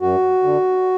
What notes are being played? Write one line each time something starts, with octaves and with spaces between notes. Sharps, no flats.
F#2 F#4
D3